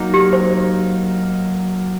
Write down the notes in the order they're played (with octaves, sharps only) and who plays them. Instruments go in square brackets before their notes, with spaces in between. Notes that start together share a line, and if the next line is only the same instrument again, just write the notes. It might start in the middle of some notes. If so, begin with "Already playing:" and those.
Already playing: [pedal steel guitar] F#3 A#3 D#4
[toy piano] G4
C5